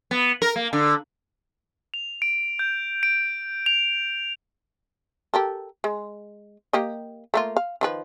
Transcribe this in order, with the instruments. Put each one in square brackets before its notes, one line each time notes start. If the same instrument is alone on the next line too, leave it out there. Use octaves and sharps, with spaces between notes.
[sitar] B3
A#4
A#3
D3
[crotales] F7
D7
G6
D7
F7
[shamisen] G4 A4 A#4
G#3
A#3 G4 D#5
A3 A#3 F4
F5
D#3 F3 B4